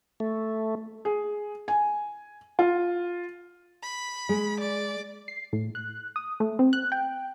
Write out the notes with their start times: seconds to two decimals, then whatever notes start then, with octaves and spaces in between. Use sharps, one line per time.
0.20 A3
1.05 G#4
1.68 G#5
2.59 F4
3.83 B5
4.29 G#3
4.60 D5
5.28 C7
5.53 A2
5.75 F#6
6.16 D#6
6.40 A3
6.59 C4
6.73 F#6
6.92 G5